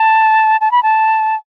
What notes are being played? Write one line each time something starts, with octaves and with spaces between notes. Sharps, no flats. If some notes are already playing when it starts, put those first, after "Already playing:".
Already playing: A5
A5
B5
A5